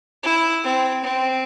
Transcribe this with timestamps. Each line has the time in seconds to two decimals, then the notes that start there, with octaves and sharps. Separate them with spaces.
0.24 E4
0.64 C4
1.04 C4